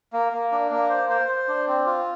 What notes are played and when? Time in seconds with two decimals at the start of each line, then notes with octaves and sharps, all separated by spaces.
0.13 A#3
0.33 A#3
0.52 D4
0.71 A#3
0.90 C5
1.10 C5
1.28 C5
1.48 D4
1.67 C4
1.86 F4